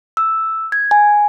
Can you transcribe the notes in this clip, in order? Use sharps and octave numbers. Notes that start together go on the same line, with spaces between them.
E6
G#6
G#5